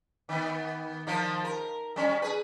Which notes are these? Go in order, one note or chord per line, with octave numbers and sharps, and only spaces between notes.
D#3 B3
D#3 F3 F4
A#4
G3 C#4
G#4 B4